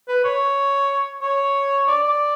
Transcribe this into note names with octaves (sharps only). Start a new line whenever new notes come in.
B4
C#5
C#5
D5
D5